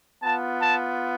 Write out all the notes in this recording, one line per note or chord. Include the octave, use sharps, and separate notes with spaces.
B3 F4 A5
A5